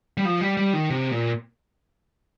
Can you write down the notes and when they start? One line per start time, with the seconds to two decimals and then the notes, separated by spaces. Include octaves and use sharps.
0.17 G3
0.25 F3
0.41 G3
0.57 G3
0.73 D#3
0.90 C3
1.11 A#2